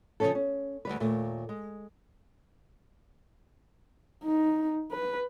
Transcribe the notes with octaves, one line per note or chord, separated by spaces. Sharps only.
C#3 E3 F3 C#4 A4
C#4
D2 G3 B4
D#2 A#2 A3
G#3
D#4
B4